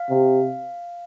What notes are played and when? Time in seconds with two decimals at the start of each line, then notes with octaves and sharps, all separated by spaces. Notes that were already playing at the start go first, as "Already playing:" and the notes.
Already playing: F5
0.10 C3